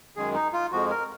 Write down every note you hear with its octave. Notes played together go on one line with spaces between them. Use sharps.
F#2 D#3 G#3 G#4
D#4
F4
F2 F3 G#3 F#4
A#4